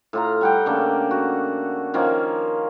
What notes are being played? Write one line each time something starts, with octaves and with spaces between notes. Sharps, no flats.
A2 F4 A#5
G3 F#5 G5
C#3 A3 A#3 D4
F#4
D#3 F3 A#3 C#4